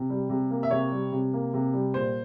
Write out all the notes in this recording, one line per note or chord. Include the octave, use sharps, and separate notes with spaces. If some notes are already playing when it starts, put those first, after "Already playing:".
Already playing: C3
G3
C3
A#3
E5
C3 C#5
G3
C3
A#3
C3
G3
A#2 C5